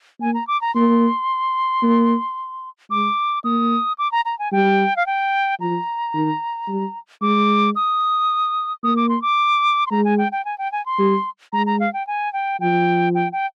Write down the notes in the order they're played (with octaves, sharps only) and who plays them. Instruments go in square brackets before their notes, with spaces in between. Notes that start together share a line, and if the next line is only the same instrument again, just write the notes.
[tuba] A#3 [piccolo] G#5
[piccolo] A#5
D6
A#5
[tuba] A#3 [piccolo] C6
[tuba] A#3
[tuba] G#3 [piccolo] D6
[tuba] A#3 [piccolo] D#6
[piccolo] D6
A#5
A#5
G#5
[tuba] G3 [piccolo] G5
[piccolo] F5
G5
[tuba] F3 [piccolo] A#5
[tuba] D#3
G3
[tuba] G#3 [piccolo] D6
[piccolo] D#6
[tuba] A#3 [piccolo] D#6
[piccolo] D6
C6
D6
C6
[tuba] G#3 [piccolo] A#5
[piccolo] G#5
G5
G5
G#5
G5
G#5
C6
[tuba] G3
[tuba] G#3 [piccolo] A#5
[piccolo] A#5
F5
G5
G#5
G5
[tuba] F3 [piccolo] G5
[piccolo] G5
G5